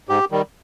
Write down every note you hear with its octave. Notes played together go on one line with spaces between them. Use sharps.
G#2 G4
D#3 G3